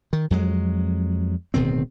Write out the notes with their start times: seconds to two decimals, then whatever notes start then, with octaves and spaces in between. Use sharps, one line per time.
0.13 D#3
0.30 F2 F#3 G#3
1.54 D1 B2 D#3 C4